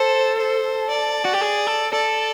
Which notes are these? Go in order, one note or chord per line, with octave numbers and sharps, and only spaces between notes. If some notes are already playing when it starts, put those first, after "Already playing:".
Already playing: A4 C5
C5
D5
F#4
G4
G#4
A4
A4 D5